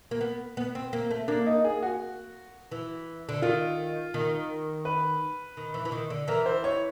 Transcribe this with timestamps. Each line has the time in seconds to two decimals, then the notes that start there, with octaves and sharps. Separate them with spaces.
0.11 A#3
0.21 B3
0.57 B3
0.75 C4
0.93 A#3
1.11 A3
1.28 A#3 D4
1.46 D#4
1.64 G#4
1.82 F#4
2.71 E3
3.29 D3
3.42 D#3 F4
4.14 D#3
4.85 B4
5.57 D#3
5.74 E3
5.85 E3
5.92 D#3
6.10 D3
6.28 E3 A#4
6.46 C5
6.64 C#5